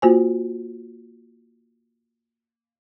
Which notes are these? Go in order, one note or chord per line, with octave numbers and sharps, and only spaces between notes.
A#3 F4 F#4 C5 G#5